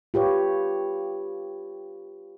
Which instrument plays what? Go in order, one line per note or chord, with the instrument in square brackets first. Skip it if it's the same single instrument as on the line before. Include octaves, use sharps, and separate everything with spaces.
[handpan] F4 G4 B4 C#5